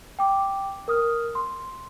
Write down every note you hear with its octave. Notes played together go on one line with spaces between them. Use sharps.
G5 D6
A#4 D#6 F6
C6